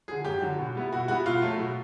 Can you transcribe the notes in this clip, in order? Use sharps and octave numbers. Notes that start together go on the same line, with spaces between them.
D3 F#3 G#4
F#2 G4
D3 F#3
B2
G3 B3 E4
B2 F#4
G3 B3 E4 F#4
B2 F4
F#3 A3
B2